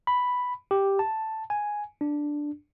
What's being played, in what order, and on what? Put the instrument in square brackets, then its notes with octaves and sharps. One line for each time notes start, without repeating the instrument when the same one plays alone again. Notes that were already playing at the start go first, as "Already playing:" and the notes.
[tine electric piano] B5
G4
A5
G#5
D4